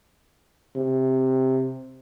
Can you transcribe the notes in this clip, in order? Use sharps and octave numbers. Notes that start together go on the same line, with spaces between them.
C3